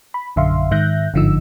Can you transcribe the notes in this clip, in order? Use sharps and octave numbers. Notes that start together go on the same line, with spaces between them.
B5
A#1 F#2 D3 E5 F5 C6
G#2 D#3 E5 F#6 G6 A#6
G1 G#2 D3 F3 D#4 E6